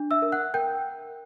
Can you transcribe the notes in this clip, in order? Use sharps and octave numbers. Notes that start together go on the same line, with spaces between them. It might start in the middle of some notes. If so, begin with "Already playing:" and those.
Already playing: D4
E5 E6
A#4
F#5 F#6
A#4 G5 G6